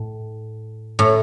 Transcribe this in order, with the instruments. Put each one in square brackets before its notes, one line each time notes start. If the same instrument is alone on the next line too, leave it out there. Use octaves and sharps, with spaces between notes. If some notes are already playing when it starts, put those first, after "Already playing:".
Already playing: [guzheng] A2
A2